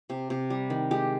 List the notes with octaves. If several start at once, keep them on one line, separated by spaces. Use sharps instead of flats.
C3
C3
G3
D#3
G#3 G4